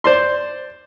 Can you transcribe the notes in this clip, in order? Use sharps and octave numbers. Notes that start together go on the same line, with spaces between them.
C5 D5 C6